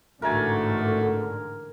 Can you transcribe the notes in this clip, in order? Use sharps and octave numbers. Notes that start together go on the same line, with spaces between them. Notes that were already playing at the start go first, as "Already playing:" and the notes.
A1 G#2 D3 A3 F#4 A#4 G#5